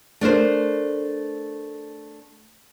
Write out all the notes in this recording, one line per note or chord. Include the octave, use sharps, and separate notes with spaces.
A3 D4 A#4 C5